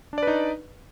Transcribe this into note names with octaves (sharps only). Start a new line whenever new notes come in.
D4 D#4 B4 D5